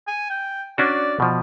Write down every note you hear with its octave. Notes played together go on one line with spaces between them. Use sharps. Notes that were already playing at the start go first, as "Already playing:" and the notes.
G#5
G5
C#4 D4 F#4 D5
B2 F3